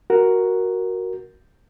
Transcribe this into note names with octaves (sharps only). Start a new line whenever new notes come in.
F#4 A#4